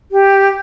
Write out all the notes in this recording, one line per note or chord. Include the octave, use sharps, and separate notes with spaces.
G4